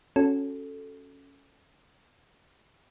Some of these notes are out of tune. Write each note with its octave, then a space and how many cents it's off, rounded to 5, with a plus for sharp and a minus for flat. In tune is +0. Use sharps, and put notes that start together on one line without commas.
C#4 +0 F#4 +0 A4 +0